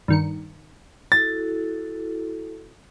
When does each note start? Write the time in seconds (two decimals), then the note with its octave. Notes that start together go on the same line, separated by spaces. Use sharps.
0.08 G2 D#3 C#7
1.12 E4 F#4 A4 A6